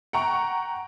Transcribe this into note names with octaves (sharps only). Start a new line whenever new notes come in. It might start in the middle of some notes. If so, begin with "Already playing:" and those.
F#5 G5 A#5 C#6